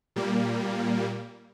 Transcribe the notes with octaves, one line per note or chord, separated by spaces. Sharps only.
A#2 G3 A#3